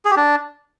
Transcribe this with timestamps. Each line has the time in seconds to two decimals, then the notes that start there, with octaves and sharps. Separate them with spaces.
0.05 G#4
0.11 G4
0.17 D4